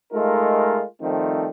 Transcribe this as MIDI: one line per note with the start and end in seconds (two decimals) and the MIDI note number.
0.13 0.82 56
0.13 0.82 57
0.13 0.82 63
0.13 0.82 65
0.13 0.82 70
1.01 1.49 51
1.01 1.49 53
1.01 1.49 55
1.01 1.49 57
1.01 1.49 60